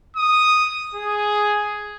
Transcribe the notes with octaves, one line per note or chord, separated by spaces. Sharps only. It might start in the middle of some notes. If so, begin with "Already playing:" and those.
D#6
G#4